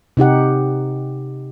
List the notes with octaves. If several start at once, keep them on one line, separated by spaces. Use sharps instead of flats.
C3 D#4 G4 F#5